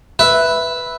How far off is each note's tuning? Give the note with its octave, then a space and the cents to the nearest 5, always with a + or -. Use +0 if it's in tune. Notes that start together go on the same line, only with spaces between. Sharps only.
B4 +0 E5 +0